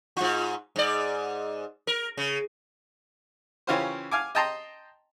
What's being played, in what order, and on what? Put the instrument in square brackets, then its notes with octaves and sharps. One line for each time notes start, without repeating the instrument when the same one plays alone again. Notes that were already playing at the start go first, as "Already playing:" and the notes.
[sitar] G#2 F4
G#2 D5
A#4
C#3
[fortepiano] C#3 E3 C#4 F4 G4 C5
F5 G#5 D6
D#5 G5 A5 A#5 C6